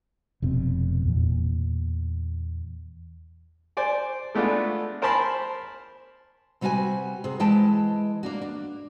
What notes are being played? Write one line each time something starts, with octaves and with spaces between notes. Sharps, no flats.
F1 B2 C4
E2 A#2
C5 D5 G#5
G#3 A3 B3 D4 F4
A#4 C5 G#5 A5 B5 C6
C3 G3 F4 F#4 B4 G#5
C3 G#4
E3 G#3 B4 G5 A5
A#3 D4 F#4
D4